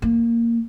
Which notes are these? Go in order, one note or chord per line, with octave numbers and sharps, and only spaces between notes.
A#3